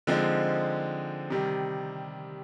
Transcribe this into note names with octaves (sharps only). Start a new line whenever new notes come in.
D3 F3 G#3 C4 D#4
C3 D#3 G3